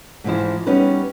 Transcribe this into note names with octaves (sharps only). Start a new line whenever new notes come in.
G#2 E3 F3 E4
G3 B3 C#4 D#4 B4